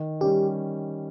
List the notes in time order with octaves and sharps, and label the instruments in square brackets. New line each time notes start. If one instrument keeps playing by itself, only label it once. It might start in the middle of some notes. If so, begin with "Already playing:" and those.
Already playing: [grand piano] D#3
[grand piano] G3 C#4 [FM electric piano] G4